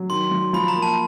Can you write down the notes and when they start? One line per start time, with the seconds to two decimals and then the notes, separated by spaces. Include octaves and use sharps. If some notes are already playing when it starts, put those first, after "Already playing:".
Already playing: F#3
0.10 D#3 C6
0.31 F#3
0.53 F3 B5
0.68 A#5
0.75 A#3
0.82 A5